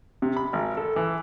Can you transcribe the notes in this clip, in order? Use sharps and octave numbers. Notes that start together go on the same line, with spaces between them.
C3
B5
G#1
A4
E3